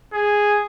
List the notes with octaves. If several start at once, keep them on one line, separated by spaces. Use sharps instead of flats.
G#4